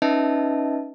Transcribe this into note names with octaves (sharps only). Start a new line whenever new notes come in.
C#4 D#4 B4 D#5 E5 A5